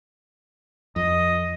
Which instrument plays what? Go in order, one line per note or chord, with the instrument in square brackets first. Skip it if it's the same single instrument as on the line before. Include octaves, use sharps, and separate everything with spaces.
[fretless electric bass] F2 [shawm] D#5